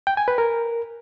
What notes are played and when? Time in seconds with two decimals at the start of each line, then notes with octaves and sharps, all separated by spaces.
0.07 G5
0.17 G#5
0.28 B4
0.38 A#4